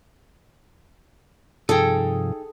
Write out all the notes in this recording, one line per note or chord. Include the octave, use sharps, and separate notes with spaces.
G2 C3 F3 D#4 G#4 A4 G5